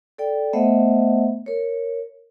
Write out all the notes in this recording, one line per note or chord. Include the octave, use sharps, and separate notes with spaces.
A4 D5 G5
A3 B3 C5 D#5 E5 F#5
A#4 C#5